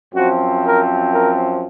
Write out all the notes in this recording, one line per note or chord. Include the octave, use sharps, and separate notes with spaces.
F#2 F3 C4 F#4
A#4
A#4